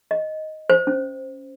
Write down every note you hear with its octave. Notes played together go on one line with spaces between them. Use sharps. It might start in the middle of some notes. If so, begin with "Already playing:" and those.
D#5
C5
C#4